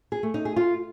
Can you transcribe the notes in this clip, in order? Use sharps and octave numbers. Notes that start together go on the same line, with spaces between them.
G#4
A3
D#4
G#4
F4